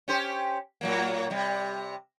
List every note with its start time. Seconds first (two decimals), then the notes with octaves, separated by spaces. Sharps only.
0.08 C#4 G4 C5
0.81 A2 F#3 A#3
1.30 C3 G3